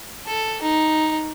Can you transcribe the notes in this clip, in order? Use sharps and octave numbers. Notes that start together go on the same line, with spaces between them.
A4
D#4